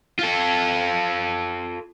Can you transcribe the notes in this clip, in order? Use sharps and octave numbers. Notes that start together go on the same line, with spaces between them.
F4 A4